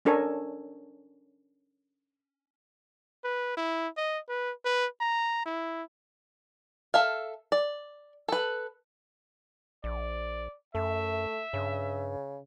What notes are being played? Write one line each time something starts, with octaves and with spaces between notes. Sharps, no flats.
C#4 D4 A4 A#4 C#5 G#5
B4
E4
D#5
B4
B4
A#5
E4
A4 E5 F5
D5
A4 B4
A#1 D5
F#2 A3 E5
G2 C#3